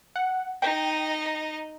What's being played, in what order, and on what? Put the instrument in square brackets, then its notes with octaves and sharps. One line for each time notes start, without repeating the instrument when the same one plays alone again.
[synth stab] F#5
[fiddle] D#4 D#5 [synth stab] G5